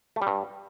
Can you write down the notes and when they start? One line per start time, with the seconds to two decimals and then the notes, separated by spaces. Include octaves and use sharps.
0.16 A3
0.22 G3
0.27 G2